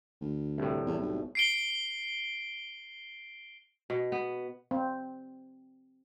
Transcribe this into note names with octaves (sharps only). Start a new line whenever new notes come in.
D2
C2 A2
E2
B1
C7 D7 G7
B2
B3
C4